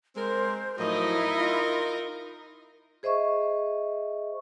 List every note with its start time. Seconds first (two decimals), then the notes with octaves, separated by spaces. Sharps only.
0.16 G#3 C4 A#4 C5
0.79 A2 F3 F#3 D#4 E4 A#4 D#5
1.38 F4
3.03 G#4 C5 D#5 E5 C#6